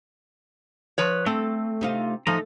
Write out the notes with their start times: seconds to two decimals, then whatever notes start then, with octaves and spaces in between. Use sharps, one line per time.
0.98 F3 B4 C#5
1.26 A3 C4 A4
1.81 C3 D#4 F4
2.27 F3 A3 D#4 A#5